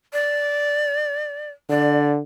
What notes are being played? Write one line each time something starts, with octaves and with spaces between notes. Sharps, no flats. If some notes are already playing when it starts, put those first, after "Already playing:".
D5
D3 D5